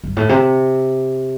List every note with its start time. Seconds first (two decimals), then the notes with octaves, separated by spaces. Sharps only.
0.04 G2
0.16 A2
0.29 C3